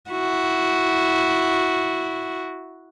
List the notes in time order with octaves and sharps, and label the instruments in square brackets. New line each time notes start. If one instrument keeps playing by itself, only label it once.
[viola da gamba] E4 F#4